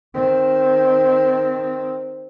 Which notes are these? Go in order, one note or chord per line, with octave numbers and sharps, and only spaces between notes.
D#3 C4